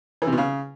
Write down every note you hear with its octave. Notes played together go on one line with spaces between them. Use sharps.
E3
C3
B2
C#3